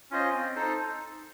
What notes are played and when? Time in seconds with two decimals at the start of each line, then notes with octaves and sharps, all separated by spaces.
0.11 C#4 F4 C5 D#5
0.33 C4
0.56 D#4 A4 C5